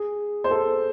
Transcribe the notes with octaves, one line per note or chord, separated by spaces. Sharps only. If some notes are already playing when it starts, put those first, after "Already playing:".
Already playing: G#4
C5
A4